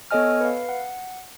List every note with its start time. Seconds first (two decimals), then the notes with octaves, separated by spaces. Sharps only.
0.11 B3 A4 C#5 D#5 G#5 F6
0.41 B4 F5
0.69 F#5